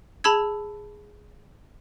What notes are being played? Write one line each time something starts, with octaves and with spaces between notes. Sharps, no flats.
G#4 A5 B5 E6 G#6